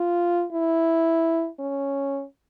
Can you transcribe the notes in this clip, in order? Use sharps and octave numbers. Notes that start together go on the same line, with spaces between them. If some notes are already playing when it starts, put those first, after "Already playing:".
Already playing: F4
E4
C#4